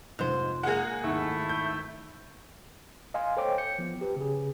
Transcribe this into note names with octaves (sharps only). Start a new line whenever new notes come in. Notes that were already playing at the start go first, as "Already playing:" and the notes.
F1 G#2 F3 C5
G#3 A#3 G#4 F#5
G#1 D#2 A3 E4
G6
D#5 F5 G#5 C6
A4 C5 C#5 G5 D6
G6 C#7
F3 B3
G4 B4
C#3 G#4